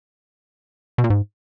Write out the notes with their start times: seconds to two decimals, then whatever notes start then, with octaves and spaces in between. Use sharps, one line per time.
0.98 B2
1.04 A#2
1.10 G#2